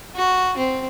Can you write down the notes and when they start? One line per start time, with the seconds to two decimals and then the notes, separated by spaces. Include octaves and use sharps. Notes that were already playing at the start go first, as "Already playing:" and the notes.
0.15 F#4
0.57 C4